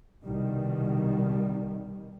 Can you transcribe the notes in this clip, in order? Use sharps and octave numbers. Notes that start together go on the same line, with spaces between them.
C2 B2 D#3 G3